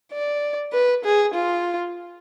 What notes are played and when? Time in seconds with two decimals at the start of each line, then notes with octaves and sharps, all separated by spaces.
0.13 D5
0.73 B4
1.04 G#4
1.34 F4